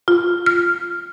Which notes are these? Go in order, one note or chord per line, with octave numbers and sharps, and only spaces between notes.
F4
F6